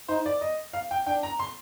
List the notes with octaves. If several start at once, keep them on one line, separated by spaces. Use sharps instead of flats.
D#4 C5
D5
D#5
F5
G5
D4 G5
A#5
C6